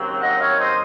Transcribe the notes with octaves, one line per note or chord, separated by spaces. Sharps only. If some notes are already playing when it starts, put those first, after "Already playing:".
Already playing: D#2 C#3 F#3 C4
D#5 F#5
C#5 F5
C5 D#5